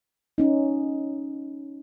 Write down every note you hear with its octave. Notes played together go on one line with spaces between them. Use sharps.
C#4 D#4